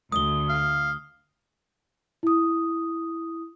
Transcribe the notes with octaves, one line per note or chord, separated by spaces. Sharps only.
D2 D#6 G7
F5
E4 D#6